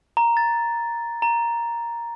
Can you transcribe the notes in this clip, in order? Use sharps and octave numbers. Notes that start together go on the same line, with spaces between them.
A#5
A6
A#5